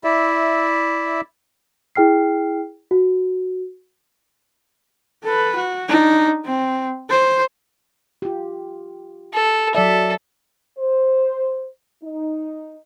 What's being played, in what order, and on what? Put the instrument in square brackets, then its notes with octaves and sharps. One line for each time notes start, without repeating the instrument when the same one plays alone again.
[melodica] E4 D5 E5
[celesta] E4 G#4 G5 F6 C7
F#4
[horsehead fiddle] A4 B4
F#4
D4 D#4
C4
C5
[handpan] F4 G4
[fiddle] A4
[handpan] F#3 D5 E5 [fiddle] A4
[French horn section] C5
D#4